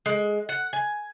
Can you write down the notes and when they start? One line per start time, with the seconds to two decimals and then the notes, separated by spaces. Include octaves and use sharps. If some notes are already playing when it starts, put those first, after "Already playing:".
0.06 G#3
0.49 F#5
0.73 G#5